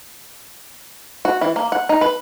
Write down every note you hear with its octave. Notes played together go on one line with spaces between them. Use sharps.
F#4
E3
A#3
F#5
D#4
B4